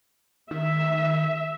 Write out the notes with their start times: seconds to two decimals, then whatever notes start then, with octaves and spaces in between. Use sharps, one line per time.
0.51 D#3 E5